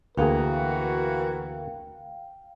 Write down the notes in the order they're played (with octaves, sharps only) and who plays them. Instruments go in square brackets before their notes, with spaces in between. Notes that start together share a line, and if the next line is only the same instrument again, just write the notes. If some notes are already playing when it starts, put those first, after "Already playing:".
[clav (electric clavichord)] D2 A#3 G#4 [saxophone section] E3 F#4 [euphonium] A#4 [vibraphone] F5 G5